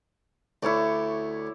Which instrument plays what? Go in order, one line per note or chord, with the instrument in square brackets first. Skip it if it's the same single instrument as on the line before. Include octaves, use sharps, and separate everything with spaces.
[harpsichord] D2 [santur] E4 C#5 D5